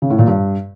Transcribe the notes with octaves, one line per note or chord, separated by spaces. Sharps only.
C#3
A2
A#2
G2